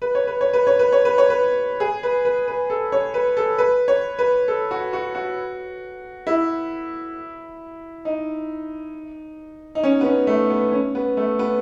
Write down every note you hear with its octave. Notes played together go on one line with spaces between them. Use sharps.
B4
C#5
B4
C#5
B4
C#5
B4
C#5
B4
C#5
B4
G#4
B4
B4
B4
A4
C#5
B4
A4
B4
C#5
B4
A4
F#4
F#4
F#4
E4
D#4
D#4
C#4
B3
C#4
A3
B3
C#4
B3
A3
B3